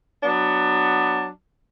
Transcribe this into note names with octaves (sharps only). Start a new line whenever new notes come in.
F#3 B3 D4